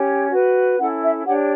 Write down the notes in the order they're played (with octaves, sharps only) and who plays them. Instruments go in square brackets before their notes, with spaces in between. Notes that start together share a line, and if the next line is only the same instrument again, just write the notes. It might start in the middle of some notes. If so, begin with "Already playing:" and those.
Already playing: [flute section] C#4 G4 C#5
F#4 B4
C#4 E4 A4 F#5
E5
D4 G4 C#5 F#5